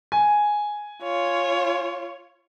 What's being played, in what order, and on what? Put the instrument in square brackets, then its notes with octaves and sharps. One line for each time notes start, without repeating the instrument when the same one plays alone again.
[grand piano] G#5
[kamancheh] F4 C#5